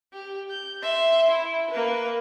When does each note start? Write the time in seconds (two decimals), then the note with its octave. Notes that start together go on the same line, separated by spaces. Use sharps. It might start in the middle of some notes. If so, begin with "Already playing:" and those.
0.13 G4
0.50 G6
0.83 E5 C6
1.31 E4
1.71 A#3 B4